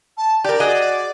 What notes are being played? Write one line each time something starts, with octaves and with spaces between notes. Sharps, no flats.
A5
G4 A#4 D5
F#4 G#4 D#5